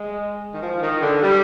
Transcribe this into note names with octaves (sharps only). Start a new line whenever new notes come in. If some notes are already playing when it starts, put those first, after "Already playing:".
Already playing: G#3
D#3
F3
D#3
D3
G3